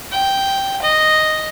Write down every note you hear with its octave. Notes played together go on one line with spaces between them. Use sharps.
G5
D#5